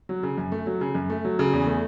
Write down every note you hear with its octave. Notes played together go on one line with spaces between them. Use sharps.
F#3
C#3
F#2
A3
F#3
C#3
F#2
A3
F#3
C#3
E2
A3